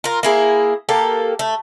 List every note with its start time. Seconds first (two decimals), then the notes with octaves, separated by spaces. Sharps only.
0.04 F4 A#4
0.23 A#3 E4 G#4
0.89 A#3 G4 A4
1.39 A3